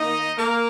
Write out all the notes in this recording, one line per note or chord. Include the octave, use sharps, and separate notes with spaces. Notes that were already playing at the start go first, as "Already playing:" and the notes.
Already playing: D#3 A#3 D#4 D#5
A#3 A#4